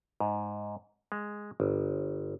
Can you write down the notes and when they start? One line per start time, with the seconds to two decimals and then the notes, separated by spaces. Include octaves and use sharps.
0.20 G#2
1.12 G#3
1.60 G1